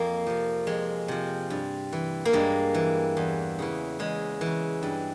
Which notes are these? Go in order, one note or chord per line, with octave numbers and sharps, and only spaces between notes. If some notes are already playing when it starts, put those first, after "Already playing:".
Already playing: F2 A#3
C3 F3
F2 G#3
C3 F3
G2
E3
A#3
G2 G#3
E3
E2
C#3 E3
E2 G#3
E3
C#3
G2